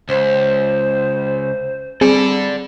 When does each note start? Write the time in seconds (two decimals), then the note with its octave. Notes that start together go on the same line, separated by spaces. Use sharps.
0.09 C#2 C5
2.01 G3 C4 G#4 A4 D5